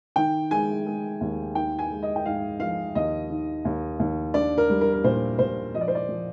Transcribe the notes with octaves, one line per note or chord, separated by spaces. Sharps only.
D#3 G5
G#3 G#5
G#3
D#2
D#4 G5
G#5
G#3
D#5
G5
G#2 F5
F3 F5
D#2 D#5
D#3
D#2
D#2
D4 D5
A#4
G3
A#4
A#4
A#2 C5
A#2 C5
F3 D#5
D5
C5
D5
F3